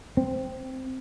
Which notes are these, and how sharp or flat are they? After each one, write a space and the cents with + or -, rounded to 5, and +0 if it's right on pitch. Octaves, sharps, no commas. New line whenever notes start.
C4 -5